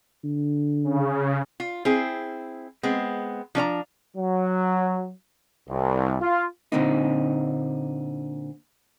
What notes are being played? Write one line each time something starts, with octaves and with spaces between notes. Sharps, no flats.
D3
C#3
F4
C4 E4 G#4
G#3 B3 C4
F3 D4 C#5 A#5
F#3
C2
F4
A#2 D3 C4 D#4